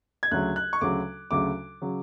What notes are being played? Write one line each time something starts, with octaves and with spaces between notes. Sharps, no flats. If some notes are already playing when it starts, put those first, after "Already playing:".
G#6
D2 C#3 F#3 F#6
F#6
C#6
D2 C#3 F#3 D6
D2 C#3 F#3 D6
C#3 F#3